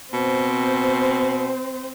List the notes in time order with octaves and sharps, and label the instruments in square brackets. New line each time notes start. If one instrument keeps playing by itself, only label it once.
[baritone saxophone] B2 [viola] C4 C5